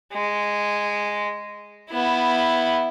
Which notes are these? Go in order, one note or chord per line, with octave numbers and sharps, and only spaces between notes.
G#3
B3 E4